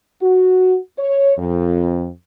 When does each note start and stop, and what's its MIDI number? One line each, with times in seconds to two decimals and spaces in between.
0.22 0.77 66
0.99 1.34 73
1.38 2.09 41